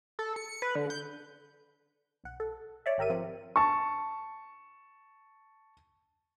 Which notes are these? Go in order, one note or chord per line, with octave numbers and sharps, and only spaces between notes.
A4
C#7
C#7
B4
D3
G6
B1 F#5
A4
C#5 D5 E5
G#1 G4 A#4 E5 D#7
F3 C4
A5 C#6